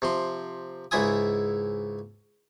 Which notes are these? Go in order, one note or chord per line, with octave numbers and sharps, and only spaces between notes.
C3 F3 C6
C#2 G#2 E4 E5 G#5 D#6